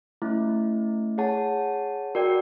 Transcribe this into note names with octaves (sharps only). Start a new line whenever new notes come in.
A3 C#4 E4
G#4 C#5 F#5 A5
F#4 A#4 D5 G5